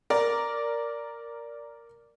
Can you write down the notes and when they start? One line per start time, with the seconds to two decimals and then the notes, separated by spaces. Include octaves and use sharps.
0.10 A#4 D5